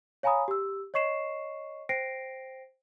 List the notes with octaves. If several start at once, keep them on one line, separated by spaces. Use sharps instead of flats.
C#5 F5 G#5 A#5 B5 D#6
G4 E6
C#5 D#5 C#6 C7 E7
C5 G5 A#6 C7 D7